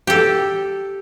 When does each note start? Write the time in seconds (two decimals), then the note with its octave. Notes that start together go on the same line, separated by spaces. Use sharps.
0.07 G4 A4